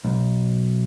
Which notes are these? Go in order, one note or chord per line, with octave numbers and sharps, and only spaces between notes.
B1